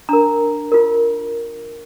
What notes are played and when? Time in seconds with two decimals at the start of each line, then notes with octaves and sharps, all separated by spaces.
0.09 D4 A#4 A#5
0.72 F4 A#4